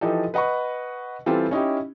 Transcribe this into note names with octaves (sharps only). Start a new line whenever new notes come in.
E3 F3 D#4 G4 A4
B4 D#5 F#5 B5 C#6
E3 G3 C4 F4 G4 A4
C#4 D#4 E4 G4